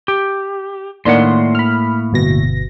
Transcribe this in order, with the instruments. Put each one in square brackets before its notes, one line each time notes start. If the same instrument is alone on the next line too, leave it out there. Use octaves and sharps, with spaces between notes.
[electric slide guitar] G4
[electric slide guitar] A2 A#3 F#5 [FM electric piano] D#3 D4 C6
[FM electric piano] B5 F6
G1 B2 A#6